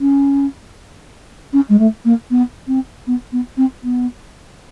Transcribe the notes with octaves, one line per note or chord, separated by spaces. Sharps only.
C#4
C#4
G#3
A3
A#3
B3
C4
B3
B3
C4
B3